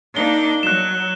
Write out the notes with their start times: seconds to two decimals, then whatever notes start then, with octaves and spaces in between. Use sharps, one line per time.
0.17 A#3 D4 D#4 G7
0.63 F#3 F#6 E7